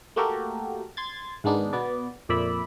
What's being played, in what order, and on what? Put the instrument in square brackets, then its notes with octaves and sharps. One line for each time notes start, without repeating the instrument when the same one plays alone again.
[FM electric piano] A3 A#3 F#4 G4 A4 A#4
C6 G#6 A6
G#2 D#3 G#3 B3 D4 D#4
B2 B3 D5
F2 A#2 D5 E5 B5